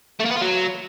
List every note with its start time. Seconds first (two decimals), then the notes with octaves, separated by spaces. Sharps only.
0.20 A3
0.25 A#3
0.30 B3
0.36 F4
0.41 F#3